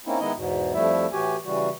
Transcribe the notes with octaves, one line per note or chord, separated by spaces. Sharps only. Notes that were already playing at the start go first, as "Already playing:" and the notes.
A#3 C4 C#4 D#4 E4
D#3 G#3 B3 D#4 E4 D#5
E2 G#2 B2
F2 F3 G3 A3 E4 E5
A2 E3 F#4 G4 G#5
C#3 E3 G3 F#4